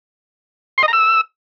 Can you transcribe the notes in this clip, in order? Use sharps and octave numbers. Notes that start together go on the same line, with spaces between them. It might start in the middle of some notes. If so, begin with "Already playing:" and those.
C6
D#5
A#5
E6